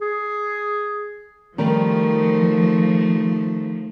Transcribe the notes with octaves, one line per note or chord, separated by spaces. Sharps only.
G#4
D#3 F3 G3 A3 A#4